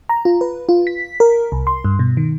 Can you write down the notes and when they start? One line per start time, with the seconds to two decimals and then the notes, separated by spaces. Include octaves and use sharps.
0.09 A#5
0.25 F4
0.41 B4
0.69 F4
0.87 B6
1.20 A#4
1.52 C2
1.67 C6
1.84 G2
1.99 B2
2.17 D#3